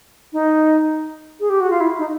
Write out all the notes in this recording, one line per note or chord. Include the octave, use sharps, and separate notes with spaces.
D#4
G#4
G4
F#4
F4
E4
D#4